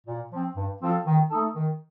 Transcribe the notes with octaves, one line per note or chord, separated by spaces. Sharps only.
A#2
F3 C4
G2
F3 C4 F4 A4
D#3
A3 D#4 A4
D#3